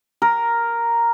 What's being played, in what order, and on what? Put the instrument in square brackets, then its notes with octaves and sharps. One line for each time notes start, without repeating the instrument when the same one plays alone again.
[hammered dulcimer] A#4